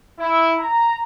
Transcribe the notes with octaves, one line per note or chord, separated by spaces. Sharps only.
E4
A#5